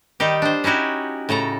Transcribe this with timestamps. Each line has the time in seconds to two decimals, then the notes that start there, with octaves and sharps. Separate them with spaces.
0.20 D#3 G3 D#4 G4
0.42 D4 C5
0.64 C#4 D#4 E4 F#4 G4
1.29 A2 C#3 A4 A#5